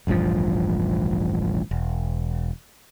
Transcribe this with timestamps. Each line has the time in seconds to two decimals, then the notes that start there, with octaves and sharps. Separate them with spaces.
0.07 E1 A1 G2 F3
1.71 E1